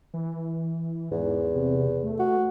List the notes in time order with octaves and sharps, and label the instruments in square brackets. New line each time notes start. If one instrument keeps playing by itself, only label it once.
[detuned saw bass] E3
[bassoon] E2 [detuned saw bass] G#2
[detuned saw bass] C3
A3
[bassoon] F#4